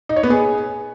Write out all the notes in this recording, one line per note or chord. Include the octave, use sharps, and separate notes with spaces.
D#4
C#5
B3
G#4